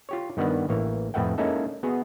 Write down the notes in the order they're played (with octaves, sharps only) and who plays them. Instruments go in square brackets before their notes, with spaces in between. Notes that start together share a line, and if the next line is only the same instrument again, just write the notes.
[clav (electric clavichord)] F4 G4 C#5
G2 D#3 B3 D5 F#5
A1 E3 A#3 C#5
F2 A2 B4 E5 F#5 G5
G#3 A#3 C#4 D#4 E4 A4
B3 F#4 G#4